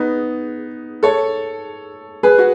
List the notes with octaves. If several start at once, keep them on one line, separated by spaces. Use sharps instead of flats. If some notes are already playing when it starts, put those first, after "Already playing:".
Already playing: B3 D#4
A4 C#5
G#4 B4
F#4